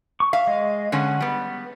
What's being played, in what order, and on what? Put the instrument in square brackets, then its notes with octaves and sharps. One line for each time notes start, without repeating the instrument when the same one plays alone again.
[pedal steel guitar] C#6
[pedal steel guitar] E5 [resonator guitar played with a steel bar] F5
[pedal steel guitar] G#3 D#5
[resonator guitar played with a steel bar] D3 G#3 C#4 [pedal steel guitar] F#5
[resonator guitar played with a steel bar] G3 B3